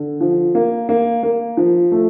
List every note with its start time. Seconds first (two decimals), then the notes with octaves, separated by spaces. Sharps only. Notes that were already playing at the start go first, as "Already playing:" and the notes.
Already playing: D3
0.21 F3
0.55 A#3
0.89 A#3
1.23 A#3
1.57 F3
1.92 A3